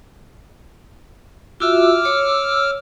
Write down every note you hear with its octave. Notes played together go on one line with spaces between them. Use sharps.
F4 F#4 E5 D6 E6 F6
C#5